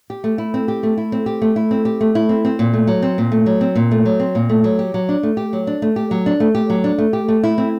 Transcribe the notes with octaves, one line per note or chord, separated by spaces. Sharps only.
G4
A3
E4
C4
G4
A3
E4
C4
G4
A3
E4
C4
G4
A3
E4
C4
C4
A#2
A3
F#3
C4
A#2
A3
F#3
C4
A#2
A3
F#3
C4
A#2
A3
F#3
G4
F#3
D4
A3
G4
F#3
D4
A3
G4
F#3
D4
A3
G4
F#3
D4
A3
G4
A3
E4
C4